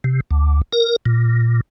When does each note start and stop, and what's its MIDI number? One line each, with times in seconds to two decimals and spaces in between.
0.04 0.20 48
0.31 0.62 38
0.73 0.96 70
1.06 1.61 46